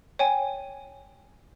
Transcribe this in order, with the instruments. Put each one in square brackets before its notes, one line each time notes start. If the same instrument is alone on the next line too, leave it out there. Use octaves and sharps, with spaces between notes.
[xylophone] C#5 G5 G#5